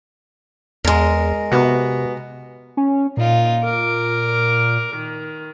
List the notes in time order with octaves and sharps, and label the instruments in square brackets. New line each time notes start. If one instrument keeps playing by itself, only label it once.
[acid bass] E2 [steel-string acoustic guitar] G#3 A#4
[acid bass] C3 [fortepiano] B3 F#4
[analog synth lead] C#4
[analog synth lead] A#2 [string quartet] D#4 F4
[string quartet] A#4 D6
D#3